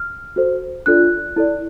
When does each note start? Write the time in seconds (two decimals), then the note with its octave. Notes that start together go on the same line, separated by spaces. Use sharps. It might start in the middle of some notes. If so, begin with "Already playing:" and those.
Already playing: F6
0.36 F#4 A4 C5
0.86 D4 F4 A4 D5 F#6
1.36 E4 A4 D5